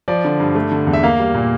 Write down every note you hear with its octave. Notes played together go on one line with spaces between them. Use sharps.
F3 D5
D3
G2
A3
D3
E2
E5
A#3 F5
G3
A#2